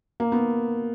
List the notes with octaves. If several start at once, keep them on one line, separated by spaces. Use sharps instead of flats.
A#3
B3